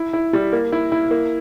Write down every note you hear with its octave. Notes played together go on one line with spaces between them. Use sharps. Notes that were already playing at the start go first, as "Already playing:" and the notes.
Already playing: E4
E4
G3
A#3
E4
E4
A#3